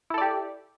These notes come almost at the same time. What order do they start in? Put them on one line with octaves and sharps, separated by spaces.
E4 A4 D5 G4